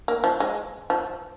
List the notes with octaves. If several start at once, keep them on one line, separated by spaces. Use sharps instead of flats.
A#3
F3
G#3
F3